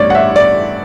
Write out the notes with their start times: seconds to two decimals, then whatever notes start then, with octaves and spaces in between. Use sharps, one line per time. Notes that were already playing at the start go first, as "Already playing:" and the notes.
Already playing: A1 G2 C#5 D5
0.10 F#5
0.15 E5
0.36 D5